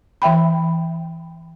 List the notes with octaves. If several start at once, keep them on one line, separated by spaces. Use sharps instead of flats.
E3 E5 G5 B5